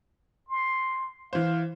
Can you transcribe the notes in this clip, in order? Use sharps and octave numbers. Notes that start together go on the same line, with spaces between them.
C6
E3 C5 F5